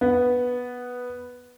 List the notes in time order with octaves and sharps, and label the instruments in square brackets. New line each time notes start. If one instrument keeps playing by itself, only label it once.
[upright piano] B3